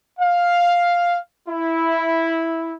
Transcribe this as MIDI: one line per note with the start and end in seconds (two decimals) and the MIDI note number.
0.20 1.17 77
1.49 2.73 64